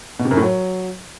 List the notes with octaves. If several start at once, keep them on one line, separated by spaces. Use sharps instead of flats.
B2
C3
F#2
A2
F#3